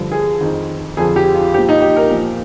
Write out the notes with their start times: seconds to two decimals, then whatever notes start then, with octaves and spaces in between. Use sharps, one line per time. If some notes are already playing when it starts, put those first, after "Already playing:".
Already playing: G2 D3 F3
0.12 G#4
0.40 F2 D#3
0.97 F2 D3 F3 G#4
1.16 G4
1.34 F4
1.53 F3 G4
1.58 A#2
1.69 D#4
1.82 G4
1.96 A#4
2.10 A#2 F3